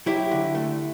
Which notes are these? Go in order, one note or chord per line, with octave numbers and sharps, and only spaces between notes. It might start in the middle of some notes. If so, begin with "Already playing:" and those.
F#3 E4 G4
D3
A3